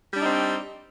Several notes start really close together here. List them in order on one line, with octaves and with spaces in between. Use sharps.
G3 D4 D#4 C4